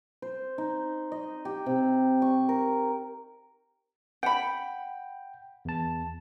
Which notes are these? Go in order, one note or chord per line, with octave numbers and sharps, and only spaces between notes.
C5
D#4
D#5
G4
C3
C#6
A#4
F#5 G5 B5
E2 A5